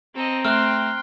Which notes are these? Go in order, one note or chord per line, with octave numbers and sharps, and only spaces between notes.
C4 A4 D#5 A#5
A3 G5 C6 F6 F#6